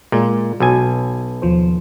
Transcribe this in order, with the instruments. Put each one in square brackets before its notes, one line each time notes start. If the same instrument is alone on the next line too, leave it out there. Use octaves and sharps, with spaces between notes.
[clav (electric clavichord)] A#2 [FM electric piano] G#3 F4
[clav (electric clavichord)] B1 G#5 [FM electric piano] F#4
[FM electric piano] D#2 F3 C5